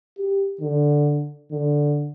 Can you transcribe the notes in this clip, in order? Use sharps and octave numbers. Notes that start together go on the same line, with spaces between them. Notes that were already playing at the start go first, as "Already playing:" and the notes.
G4
D3
D3